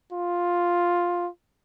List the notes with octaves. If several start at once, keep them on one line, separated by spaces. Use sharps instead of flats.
F4